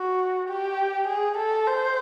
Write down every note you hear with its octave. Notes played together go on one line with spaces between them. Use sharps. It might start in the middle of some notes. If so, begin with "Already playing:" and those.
Already playing: F#4
G4
G#4
A4
C5